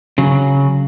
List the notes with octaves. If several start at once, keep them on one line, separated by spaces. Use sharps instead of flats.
C#3 F#3